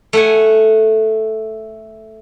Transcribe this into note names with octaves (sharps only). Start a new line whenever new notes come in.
A3 F#5 G#5